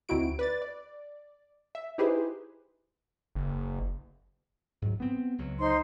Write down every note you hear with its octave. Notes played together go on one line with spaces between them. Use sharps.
D2 C4 D#4 E4 F#4 D7
B4 D5 A6
D5
E5
D#4 E4 G4 G#4 B4 C5
F#1
G#2 F#3
B3 C4
C#2 F#3
D#4 C5 C6